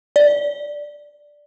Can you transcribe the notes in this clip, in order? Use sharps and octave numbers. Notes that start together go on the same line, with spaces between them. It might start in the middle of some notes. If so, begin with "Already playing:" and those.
D5